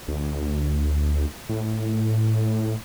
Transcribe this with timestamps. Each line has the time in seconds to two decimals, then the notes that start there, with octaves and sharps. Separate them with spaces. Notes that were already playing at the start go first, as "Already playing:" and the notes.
0.08 D2
1.49 A2